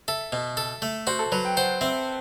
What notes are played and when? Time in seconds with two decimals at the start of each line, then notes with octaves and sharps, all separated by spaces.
0.08 A4 E5
0.32 B2
0.57 A4
0.82 A3
1.07 F#4 C5
1.19 A4
1.32 F#3 B4
1.45 G5
1.57 C5 F#5
1.81 C4 E5